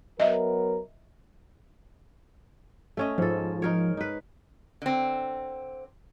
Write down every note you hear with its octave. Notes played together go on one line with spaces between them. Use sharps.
F#3 B3 A#4 D#5 E5
A3 C#4 D#5
G#2 F3 A4
D#4 A#4 C#5
D#4 B4
D3 C4